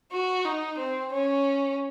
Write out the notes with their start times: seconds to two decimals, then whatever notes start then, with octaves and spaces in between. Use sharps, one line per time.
0.12 F#4
0.45 D#4
0.79 C4
1.13 C#4